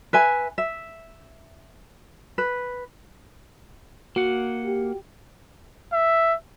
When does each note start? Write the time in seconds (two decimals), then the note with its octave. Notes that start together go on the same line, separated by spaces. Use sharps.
0.13 B4 E5 G#5
0.58 E5
2.38 B4
4.16 A#3 F#4 F#5
4.64 G4
5.93 E5